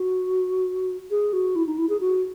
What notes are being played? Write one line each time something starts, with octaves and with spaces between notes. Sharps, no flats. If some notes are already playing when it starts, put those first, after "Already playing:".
Already playing: F#4
G#4
F#4
E4
D#4
E4
G#4
F#4